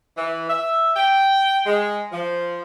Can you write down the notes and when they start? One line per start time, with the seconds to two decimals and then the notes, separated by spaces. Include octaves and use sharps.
0.17 E3
0.49 E5
0.96 G5
1.66 G#3
2.12 F3